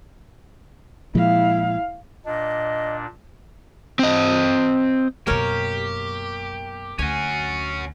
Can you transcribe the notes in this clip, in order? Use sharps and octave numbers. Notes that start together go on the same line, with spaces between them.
A#2 F3 G#3 E4 F5
A#2 D4 D#5
C4 D#5
F#2 B2 A#3 G4 A#4 C#5
D2 C#4 F#4 G#5